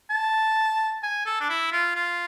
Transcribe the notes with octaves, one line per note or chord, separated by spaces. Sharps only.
A5
G#5
A4
D4
E4
F4
F4